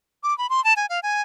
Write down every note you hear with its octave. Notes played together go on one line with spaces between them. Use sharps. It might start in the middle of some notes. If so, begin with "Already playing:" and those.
D6
B5
C6
A5
G#5
F5
G#5